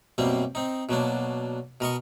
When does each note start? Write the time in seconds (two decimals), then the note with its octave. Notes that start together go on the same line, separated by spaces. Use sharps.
0.18 F#2 B2 G3 A#3 C4
0.55 C4 D#4
0.89 B2 F#3 A#3 D4
1.80 B2 A#4 D#5 C#6